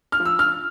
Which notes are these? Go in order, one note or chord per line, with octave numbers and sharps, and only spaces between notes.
F6
F3
E6
F6